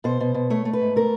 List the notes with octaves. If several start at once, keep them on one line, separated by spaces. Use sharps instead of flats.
B2 C5
B2
B2
A3 C#5
A3
B4
G#2
A3 A#4